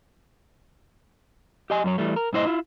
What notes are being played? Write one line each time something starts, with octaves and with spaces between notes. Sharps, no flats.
G4 D#5 G#5
F#2 F#3 C#5
E3 G3 A3
A#4
G2 A#2 E4 C5 D#5
E4 F4